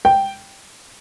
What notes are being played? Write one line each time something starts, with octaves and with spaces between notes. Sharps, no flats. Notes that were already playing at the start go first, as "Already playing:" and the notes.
G5